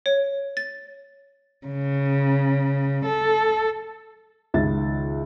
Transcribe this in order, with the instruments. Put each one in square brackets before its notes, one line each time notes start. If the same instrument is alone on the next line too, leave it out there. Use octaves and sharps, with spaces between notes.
[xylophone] C#5
A6
[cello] C#3
A4
[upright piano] C#2 D#3 E5 A6